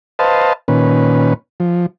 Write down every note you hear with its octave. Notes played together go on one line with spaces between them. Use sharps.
B4 C5 D#5 F5 A5
A#2 D#3 C#4 B4
F3